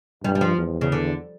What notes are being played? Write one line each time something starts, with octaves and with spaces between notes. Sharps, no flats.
G2 G3
G3
F3
E2
C#3
D3